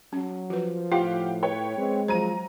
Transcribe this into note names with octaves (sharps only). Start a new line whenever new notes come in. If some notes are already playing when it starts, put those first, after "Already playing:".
F#3 C#4
F3 F#4 B4
A2 F4 G4 F5 F#5
B4 C#5 G5
G#3 C4
F3 F#3 C5 A#5 D#7